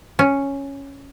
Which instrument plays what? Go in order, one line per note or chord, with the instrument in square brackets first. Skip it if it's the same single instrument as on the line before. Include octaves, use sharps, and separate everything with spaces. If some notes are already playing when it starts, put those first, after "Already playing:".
[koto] C#4